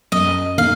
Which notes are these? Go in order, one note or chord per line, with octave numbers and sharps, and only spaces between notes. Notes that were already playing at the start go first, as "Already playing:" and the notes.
F#2 D#5
D#3 A#3 F5